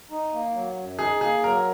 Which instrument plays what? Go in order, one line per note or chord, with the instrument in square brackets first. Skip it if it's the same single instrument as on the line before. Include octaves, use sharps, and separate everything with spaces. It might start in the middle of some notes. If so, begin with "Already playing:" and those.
[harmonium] D#4
A#3
F#3
F#2
[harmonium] D#4 [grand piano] G#4
[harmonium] A#3 [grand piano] G#4
[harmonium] F#3 [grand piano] A#4